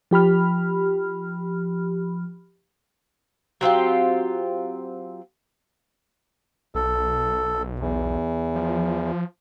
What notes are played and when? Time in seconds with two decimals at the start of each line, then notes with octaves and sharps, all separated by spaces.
0.11 F3 G4 B5 F6
3.61 F#3 C4 F4 G4
6.75 B1 A4
7.80 E2
8.55 F3